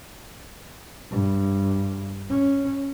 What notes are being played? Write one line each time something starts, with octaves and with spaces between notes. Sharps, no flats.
G2
C#4